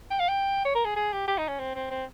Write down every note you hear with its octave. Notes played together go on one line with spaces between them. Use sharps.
G5
F5
G5
C#5
A#4
G#4
G#4
G4
G4
D#4
C#4
C4
C4
C4